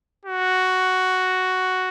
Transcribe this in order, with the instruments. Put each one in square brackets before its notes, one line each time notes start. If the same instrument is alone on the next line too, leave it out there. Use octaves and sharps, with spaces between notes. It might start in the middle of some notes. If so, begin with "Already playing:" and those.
[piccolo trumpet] F#4